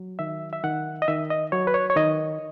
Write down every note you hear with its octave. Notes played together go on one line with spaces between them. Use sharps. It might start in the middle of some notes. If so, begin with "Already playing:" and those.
Already playing: F#3
D#3 E5
E5
D#3 F#5
D#5
D#3 E5
D#5
F#3 C#5
B4
C#5
C#5
D#3 D#5